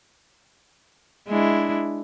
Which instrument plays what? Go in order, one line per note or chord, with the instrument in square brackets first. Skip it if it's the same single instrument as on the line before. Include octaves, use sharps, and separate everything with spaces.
[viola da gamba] G#3 D4 E4